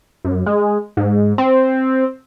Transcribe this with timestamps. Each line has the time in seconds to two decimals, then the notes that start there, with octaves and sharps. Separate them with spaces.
0.25 F#2
0.46 G#3
0.97 G#2
1.38 C4